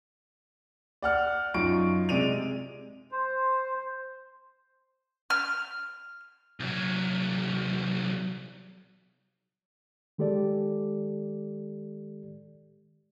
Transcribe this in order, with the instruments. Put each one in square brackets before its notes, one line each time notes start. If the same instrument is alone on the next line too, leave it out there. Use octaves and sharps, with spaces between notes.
[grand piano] D5 F#5 F6
F#2 D#4 F4 C#6 D7
C3 G#3 D5 D7 D#7 F7
[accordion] C5
[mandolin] F6
[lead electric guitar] C2 F#3
[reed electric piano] D#3 G#3 G4 A4 D5